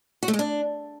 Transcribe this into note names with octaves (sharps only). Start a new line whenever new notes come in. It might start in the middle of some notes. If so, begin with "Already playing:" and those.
F#4
A3
G#3
D4